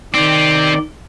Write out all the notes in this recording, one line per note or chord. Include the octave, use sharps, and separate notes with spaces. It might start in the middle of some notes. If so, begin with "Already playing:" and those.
D#3 C4 G4 D5